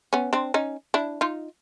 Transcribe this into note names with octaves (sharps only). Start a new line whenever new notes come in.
B3 C#4
C4 D4
C#4 D#4
D4 E4
D#4 F4